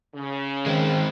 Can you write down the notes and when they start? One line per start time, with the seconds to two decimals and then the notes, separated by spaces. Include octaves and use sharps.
0.15 C#3
0.66 D#3 G#3 C4